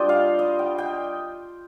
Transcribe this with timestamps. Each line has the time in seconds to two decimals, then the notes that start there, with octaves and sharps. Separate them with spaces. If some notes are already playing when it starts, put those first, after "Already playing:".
Already playing: G3 D4 F4 D#5 G5
0.09 F5
0.39 D#5
0.59 G5
0.78 G5